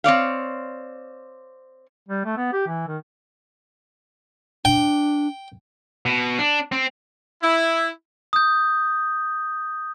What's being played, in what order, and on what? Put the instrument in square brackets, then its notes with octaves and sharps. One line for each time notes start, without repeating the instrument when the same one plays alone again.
[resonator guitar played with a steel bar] C4 C#5 D5 F5
[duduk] G3
A3
B3
G4
E3
D#3
[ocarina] D4 [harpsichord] G5
[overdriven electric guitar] B2
D4
C4
[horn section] E4
[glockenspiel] D#6 G6